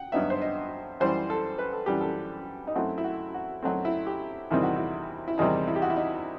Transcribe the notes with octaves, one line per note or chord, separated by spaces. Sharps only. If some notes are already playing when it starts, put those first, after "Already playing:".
Already playing: F#5 G5
G2 F#3 B3 D#4 E5
C5
D#5
F#2 E3 G3 C5
A4
B4
A4
F#2 E3 G3 G4
A4
D#4
F#2 F#3 A3 C4 E4
E4
F#4
F#4
F#2 F#3 A3 C4 D#4
E4
G4
E2 C3 D#3 G3 C4 E4
F#4
E4
E4
E2 C3 D#3 G3 C4 D#4
E4
G4
F#4
E4
D#4